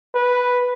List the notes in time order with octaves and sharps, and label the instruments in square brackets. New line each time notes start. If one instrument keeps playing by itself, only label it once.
[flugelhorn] B4